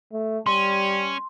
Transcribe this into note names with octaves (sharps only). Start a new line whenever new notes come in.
A3
G3 C#4 C6